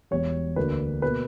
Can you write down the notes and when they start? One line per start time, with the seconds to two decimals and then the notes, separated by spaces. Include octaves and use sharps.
0.11 E1 E2 B2 G3 C#5
0.56 D2 D3 A#3 B4
1.02 B2 A#3 B4